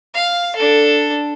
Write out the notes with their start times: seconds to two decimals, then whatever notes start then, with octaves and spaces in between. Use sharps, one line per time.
0.14 F5
0.56 D4 A4